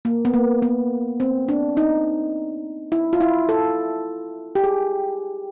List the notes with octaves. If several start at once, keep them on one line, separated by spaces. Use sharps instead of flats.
A#3
B3
A#3
B3
C4
D4
D#4
E4
F4
E4
A4
G4
G#4